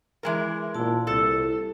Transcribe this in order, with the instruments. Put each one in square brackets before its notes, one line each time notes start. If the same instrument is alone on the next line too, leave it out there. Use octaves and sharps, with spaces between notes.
[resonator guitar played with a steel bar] E3 G#3 A#4
[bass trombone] A#2 [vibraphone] E4 A5
[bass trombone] C2 [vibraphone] E4 [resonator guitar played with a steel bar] A4